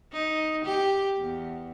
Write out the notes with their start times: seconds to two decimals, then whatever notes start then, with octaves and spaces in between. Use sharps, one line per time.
0.13 D#4
0.65 G4
1.18 E2